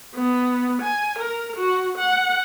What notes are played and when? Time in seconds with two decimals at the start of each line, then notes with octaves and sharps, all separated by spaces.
0.15 B3
0.82 G#5
1.19 A#4
1.56 F#4
1.98 F#5